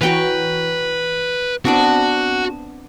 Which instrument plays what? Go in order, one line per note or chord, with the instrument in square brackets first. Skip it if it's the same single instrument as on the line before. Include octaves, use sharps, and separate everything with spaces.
[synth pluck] E3 F#4 [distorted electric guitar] B4 [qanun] C#5 G5 A#5
[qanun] B3 D4 D5 [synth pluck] C4 [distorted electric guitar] F#4